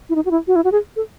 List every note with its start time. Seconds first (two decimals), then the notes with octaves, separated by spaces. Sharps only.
0.09 E4
0.15 D#4
0.25 F#4
0.31 E4
0.47 F#4
0.56 E4
0.64 F#4
0.72 G#4
0.96 A4